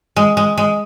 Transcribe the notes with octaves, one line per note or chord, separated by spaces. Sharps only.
G#3
G#3
G#3